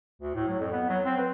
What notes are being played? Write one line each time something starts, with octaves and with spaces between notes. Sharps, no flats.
D2
A2
F#3
F2
B3
F#3
C4
B4